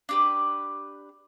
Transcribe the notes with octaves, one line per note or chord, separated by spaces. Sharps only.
D4 G4 B4